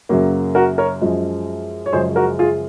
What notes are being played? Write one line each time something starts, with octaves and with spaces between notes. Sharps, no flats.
F#2 C#3 F#3 A#3
F#4 A#4
A#4 C#5
F#2 F3 G#3
C#5
F#2 C#3 F3 G#3 G#4 C5
F#4 A#4
F4 G#4